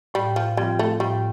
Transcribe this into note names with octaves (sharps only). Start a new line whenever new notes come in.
A2 G3
F3
F3 G3 C4 F4
A3
A2 G3